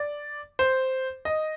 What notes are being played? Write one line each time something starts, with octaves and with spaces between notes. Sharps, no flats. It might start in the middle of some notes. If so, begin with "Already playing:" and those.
Already playing: D5
C5
D#5